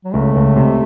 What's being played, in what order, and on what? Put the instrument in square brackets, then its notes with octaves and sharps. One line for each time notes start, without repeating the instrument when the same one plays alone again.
[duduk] F#3
[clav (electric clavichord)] C#2 [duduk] A3
[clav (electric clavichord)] C#2
C3